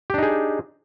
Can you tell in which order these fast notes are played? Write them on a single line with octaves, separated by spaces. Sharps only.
G4 D4 D#4 G#4